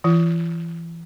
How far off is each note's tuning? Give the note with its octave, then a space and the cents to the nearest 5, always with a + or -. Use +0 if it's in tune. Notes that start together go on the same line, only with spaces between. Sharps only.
E3 +20 F4 -35